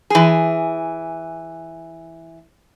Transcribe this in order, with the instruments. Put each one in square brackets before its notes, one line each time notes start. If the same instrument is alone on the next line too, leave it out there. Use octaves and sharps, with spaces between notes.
[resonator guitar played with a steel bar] E3 G#4